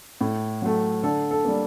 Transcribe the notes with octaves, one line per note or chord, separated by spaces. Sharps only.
A2
F#3 A3
D3 A4
A4
G3 A#3